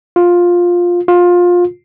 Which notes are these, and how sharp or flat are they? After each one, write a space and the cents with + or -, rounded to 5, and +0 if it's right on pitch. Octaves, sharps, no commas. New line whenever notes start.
F4 +10
F4 +20